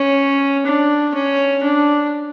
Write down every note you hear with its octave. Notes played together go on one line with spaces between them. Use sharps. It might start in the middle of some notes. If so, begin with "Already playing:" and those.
Already playing: C#4
D4
C#4
D4